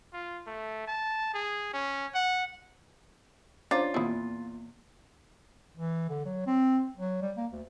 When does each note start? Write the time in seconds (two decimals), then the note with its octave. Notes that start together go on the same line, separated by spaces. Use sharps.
0.13 F4
0.47 A3
0.87 A5
1.34 G#4
1.73 C#4
2.15 F#5
3.71 C#4 D4 F4 C5 C#5 A#5
3.94 E2 A#2 B3 E4
5.78 E3
6.09 D3
6.25 F#3
6.47 C4
6.97 F#3
7.22 G3
7.37 A#3
7.52 D2